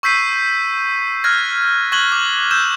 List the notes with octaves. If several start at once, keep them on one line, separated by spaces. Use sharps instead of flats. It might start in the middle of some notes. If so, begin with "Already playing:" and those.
C#6 E6 G6 B6 C7 D#7
F6 F#6 G#6 A#6
C#6 F#6 G#6 F#7 G7
D6
E6 G6 E7